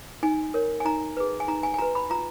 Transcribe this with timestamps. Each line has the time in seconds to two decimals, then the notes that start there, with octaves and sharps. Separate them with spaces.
0.23 D#4 G#5
0.54 A#4 C#5
0.80 G#5
0.85 D#4 A#5
1.17 G#4 B4
1.40 G#5
1.48 D#4 A#5
1.63 G#5
1.74 G#5
1.78 F#4 B4 A#5
1.95 B5
2.10 F4 A#5